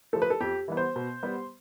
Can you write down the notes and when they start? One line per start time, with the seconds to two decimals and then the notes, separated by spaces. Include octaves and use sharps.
0.13 F3 A3 A4
0.22 B4
0.30 A4
0.40 F2 G4
0.68 E3 G3 B3
0.77 C5
0.96 B2
1.23 G3 B3